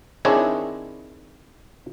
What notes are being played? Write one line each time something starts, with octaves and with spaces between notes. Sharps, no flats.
D#3 C4 D4 E4 G#4 C#5